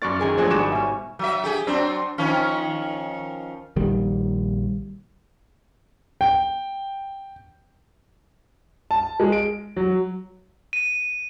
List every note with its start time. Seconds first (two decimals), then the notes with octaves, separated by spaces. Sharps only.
0.02 F#2 F#4 D5 F5 C#6 A6
0.19 D#3 G#4 A#4
0.38 F3 F#3 A3 A#3 D4 F#4 G#4 D#5
0.50 G#1 G#2 G3 G#3 F#4 D6 E7
0.72 B2 C#4 E5
1.19 F#3 E5
1.44 G4 G#4
1.67 F#3 C4 D4
2.18 D#3 F3 C#4
3.76 A#1 D#3 G3
6.21 G5
8.91 A5
9.20 G#3
9.32 D7
9.77 F#3
10.73 D#7